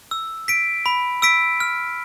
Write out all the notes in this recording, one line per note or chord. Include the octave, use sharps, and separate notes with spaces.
E6
B6 D7
B5
E6 B6 D7
F6